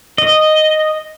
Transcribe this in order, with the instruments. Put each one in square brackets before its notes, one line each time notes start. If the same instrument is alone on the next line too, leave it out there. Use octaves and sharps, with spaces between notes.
[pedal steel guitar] D#5